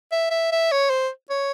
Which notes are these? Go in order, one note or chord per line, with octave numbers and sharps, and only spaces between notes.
E5
E5
E5
C#5
C5
C#5